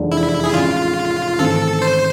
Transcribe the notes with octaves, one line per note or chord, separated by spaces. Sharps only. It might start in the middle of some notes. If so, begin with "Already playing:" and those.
Already playing: F1 E2 C3 G#3 D4
E4
G#4
A1 A2 E3 G#3 F4
G#1 G#2 E3 A3 C4 A4
C5